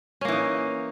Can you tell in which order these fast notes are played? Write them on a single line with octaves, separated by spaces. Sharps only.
C#4 A#3 E3 D#4